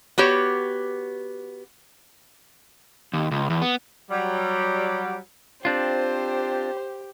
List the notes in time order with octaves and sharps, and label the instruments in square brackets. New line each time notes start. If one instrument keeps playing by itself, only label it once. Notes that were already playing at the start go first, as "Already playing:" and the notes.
[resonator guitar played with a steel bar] B3 F#4 G4 C#5
[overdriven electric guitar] D#2
C#2
E2
B3
[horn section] F#3 G3
[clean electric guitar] C4 D4 F4 [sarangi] G4 [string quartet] C5